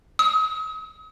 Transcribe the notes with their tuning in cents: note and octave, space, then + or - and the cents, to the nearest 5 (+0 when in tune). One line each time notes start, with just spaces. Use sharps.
D#6 +40